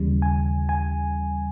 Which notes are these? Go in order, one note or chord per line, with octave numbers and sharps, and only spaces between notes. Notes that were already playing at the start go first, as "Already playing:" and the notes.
Already playing: D#2 C#3 E3 G3
G#5
G#5